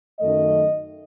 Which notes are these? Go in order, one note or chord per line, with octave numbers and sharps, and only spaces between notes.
F#2 D#3 A3 D#5